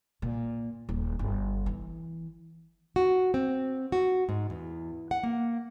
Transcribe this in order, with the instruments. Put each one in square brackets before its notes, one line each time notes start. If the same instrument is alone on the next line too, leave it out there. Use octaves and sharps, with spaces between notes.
[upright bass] A#2
D#1
G1
E3
[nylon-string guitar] F#4
C4
F#4
G#2
E2
F#5
A#3